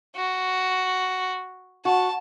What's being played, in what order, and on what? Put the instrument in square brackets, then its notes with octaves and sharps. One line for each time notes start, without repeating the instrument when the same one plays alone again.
[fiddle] F#4
[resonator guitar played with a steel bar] F#4 [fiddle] A5